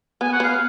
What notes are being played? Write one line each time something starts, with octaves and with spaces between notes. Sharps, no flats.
B3 G#5
F#5
B3 F5